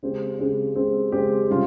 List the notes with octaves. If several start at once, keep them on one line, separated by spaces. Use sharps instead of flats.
C#3 G#3 C4 G4
C#3 G#3 C4 G4
C#3 G#3 C4 G4
C#3 G#3 C4 G4
C3 G3 C#4 F4